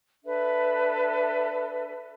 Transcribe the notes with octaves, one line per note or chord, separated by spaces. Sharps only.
D4 A4 B4 E5